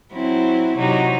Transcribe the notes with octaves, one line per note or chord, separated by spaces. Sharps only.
F#3 C4 E4
C3 F#3 D#4